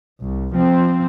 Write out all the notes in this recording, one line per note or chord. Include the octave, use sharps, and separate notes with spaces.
C2
F3 C4